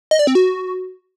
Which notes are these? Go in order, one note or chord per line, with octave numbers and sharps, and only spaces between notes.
D#5
D5
C4
F#4